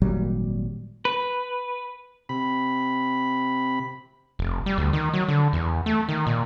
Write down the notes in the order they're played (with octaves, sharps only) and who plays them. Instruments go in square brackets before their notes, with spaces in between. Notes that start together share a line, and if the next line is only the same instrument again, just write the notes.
[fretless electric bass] G#1 A#2 F#3 G3
[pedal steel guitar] B4
[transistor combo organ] C3 B5
[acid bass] F1
G3
D2
D#3
F#3
D3
E2
A3
D#3
A#2